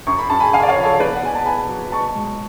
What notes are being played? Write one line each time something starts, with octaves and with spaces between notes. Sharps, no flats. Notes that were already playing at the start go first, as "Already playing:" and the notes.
F#2 C#6
B5
F#2 A5
G#5 B5
C#3 F5 G#5
D5
C#5 F5
F3
A4 C#5
B3 B4 D5
F#5
B2 G#5
A5
B3 G#5 B5
F#3
B2 A5 C#6
G#3